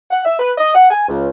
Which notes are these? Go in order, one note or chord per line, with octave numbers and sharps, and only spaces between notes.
F#5
E5
B4
D#5
F#5
G#5
C#2